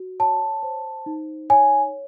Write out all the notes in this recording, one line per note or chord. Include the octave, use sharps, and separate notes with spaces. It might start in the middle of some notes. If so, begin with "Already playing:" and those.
Already playing: F#4
C#5 A5
C5
D#4
C#5 G#5